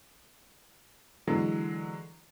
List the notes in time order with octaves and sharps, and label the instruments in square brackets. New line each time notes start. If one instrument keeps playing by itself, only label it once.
[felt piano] D3 E3 F#3 G#3